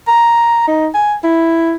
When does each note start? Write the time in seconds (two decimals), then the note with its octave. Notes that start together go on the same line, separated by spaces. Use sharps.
0.08 A#5
0.68 D#4
0.95 G#5
1.24 E4